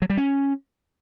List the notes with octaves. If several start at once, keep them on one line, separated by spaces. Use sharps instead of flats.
F#3
G3
C#4